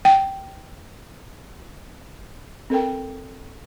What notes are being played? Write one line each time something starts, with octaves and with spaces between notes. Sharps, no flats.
G5
C4 A4 A#4 G5